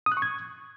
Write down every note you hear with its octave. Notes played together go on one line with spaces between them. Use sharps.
D#6
F#6
C#6
G#6